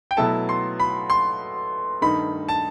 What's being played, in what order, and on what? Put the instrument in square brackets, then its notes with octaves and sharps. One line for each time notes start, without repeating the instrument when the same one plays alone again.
[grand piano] G5
[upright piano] B2 F#3 A3 E4 A4 [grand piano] A5
[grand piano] C6
B5
C6
[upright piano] G2 D#3 A3 D#4 [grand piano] B5
[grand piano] A5